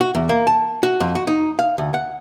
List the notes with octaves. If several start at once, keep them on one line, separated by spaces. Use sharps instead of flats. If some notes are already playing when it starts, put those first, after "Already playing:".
F#4
E2
A#3
A5
F#4
F2
F#4
D#4
F5
D2
F#5